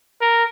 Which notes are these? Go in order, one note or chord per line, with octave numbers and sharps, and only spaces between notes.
A#4